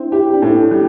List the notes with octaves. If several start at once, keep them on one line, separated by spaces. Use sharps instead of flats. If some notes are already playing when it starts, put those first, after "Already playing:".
Already playing: C4 D4 E4
E4 G4
D4
A2
G3